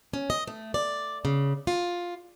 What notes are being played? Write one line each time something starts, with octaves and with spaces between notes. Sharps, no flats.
C#4
D#5
A3
D5
C#3
F4